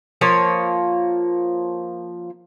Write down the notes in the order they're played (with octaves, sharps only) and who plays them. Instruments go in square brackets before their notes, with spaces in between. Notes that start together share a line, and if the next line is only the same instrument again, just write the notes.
[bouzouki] F3 A#3 C#5